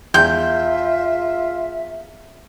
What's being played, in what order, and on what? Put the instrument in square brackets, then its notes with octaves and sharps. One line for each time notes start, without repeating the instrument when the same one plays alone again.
[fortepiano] E2 G5 C6 [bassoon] F4 [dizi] E5 [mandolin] G6